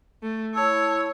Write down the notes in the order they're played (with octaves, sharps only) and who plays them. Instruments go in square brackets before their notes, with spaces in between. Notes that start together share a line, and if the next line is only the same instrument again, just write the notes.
[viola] A3
[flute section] E4 A5 E6 [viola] C#5